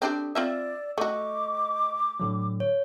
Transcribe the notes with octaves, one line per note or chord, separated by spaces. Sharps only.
C4 D4 G4 A4
C4 F4 D5 E5 E6
A3 F#4 D#5 C#6 D6
A2 D3 F#3
C#5